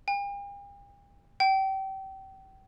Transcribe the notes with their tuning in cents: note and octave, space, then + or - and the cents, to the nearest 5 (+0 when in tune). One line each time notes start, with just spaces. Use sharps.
G5 +45
G5 -30